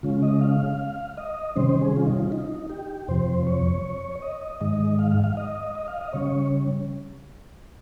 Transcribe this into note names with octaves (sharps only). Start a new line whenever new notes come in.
C#3 G#3 C#4 F4
D#5
F5
D#5
C3 D#3 G3 C#4 C5
C5
G#4
F4
D#4
F4
D#4
G4
F2 C3 F3 C5
C#5
D#5
D#5
G#2 D#3 G#3 D#5
F5
F5
F5
D#5
D#5
F5
D#5
C#3 G3 C#4 C#5